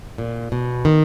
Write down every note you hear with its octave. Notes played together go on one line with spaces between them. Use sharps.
A#2
B2
D#3